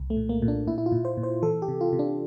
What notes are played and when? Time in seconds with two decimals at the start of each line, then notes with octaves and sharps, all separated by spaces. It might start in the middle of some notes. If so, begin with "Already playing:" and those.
Already playing: C2
0.10 A3
0.17 A#2
0.29 A#3
0.42 A#2
0.48 D4
0.67 A#2 E4
0.78 E4
0.86 F4
0.92 A#2
1.05 C5
1.17 A#2
1.23 C5
1.43 E3 A4
1.62 G4
1.68 C3
1.81 F4
1.93 C3
1.99 D4